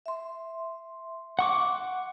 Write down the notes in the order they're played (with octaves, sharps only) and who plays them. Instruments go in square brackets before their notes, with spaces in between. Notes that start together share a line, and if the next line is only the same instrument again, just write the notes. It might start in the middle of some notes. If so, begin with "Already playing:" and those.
[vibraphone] E5 C6
[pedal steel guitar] F#5 C#6 D6